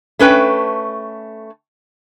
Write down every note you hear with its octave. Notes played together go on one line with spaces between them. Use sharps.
A3 C#4 B4 G5